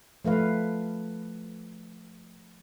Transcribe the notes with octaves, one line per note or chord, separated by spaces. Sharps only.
F3 A3 B4 F5